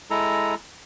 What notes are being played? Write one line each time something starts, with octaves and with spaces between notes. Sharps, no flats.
G#3 E4 A4 A#5